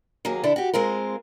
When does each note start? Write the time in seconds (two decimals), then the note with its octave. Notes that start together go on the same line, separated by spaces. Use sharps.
0.25 D#2 F#3 A#3 G#4
0.44 D3 D4 E4
0.56 F#4 G4
0.74 G#3 C4 F4 A#4